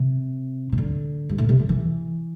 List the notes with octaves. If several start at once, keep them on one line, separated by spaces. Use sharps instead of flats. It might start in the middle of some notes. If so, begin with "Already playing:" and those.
Already playing: C3
C3
D3
G2
A2
C3
D3
E3